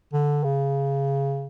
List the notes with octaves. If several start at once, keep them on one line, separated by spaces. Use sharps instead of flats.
D3
C#3